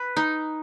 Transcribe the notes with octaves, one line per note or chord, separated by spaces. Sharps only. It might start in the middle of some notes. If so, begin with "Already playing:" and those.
Already playing: B4
D#4